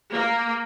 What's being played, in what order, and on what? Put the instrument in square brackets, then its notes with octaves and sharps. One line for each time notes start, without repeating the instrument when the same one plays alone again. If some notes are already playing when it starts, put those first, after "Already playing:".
[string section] A#3